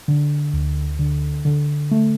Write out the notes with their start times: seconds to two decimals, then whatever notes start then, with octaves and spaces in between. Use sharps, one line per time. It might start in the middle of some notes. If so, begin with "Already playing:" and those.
0.08 D3
0.53 D2
0.99 D3
1.45 D3
1.91 A3